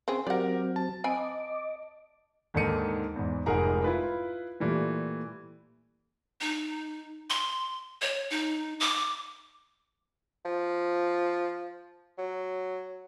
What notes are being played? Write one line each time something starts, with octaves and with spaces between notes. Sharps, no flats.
C#3 C4 G#4
F#3 C4 G4 A#4 D5 F#5
A5
C4 D#5 G#5 B5 D6
D#2 G#2 D3 D#3 C#7 D#7
E2 G#2
F1 G#2 G#4 A#4 F#5 A#5
E4 F4 B4
A#2 E3 G3 A3
D#4
C6
C#5
D#4
D6
F3
F#3